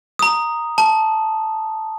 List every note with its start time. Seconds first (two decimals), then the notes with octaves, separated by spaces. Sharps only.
0.19 A#5 D#6
0.78 A5